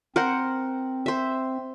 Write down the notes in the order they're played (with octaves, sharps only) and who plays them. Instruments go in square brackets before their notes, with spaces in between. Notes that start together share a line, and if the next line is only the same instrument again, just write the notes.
[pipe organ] C4 [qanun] A#4 C5 F#5
[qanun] C5 E5